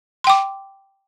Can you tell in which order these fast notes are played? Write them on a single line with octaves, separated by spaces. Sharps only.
C6 G5 D6